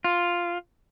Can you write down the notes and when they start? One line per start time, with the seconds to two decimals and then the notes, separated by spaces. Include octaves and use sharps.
0.04 F4